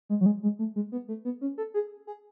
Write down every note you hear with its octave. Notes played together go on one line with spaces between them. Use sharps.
G#3
F#3
G#3
G#3
A3
G#3
B3
A3
B3
C#4
A4
G#4
G#4